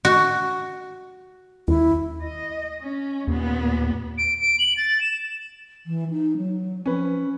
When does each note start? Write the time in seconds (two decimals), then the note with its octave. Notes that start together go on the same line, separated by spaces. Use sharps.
0.05 F#4
1.68 D#2 E4
2.22 D#5
2.82 C#4
3.27 D#2 A#2 B3
4.18 D7
4.40 D7
4.59 F#7
4.77 A6
5.01 E7
5.86 E3
6.11 D#4
6.37 F#3
6.86 F3 C#4 B4